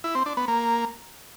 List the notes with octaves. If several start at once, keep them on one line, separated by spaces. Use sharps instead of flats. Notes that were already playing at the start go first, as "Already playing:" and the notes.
E4
C4
D4
B3
A#3